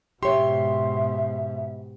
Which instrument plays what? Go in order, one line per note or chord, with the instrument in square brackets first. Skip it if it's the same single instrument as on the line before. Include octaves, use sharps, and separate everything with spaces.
[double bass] G#2 B2 [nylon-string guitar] G4 C#5 [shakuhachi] E5 [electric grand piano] C6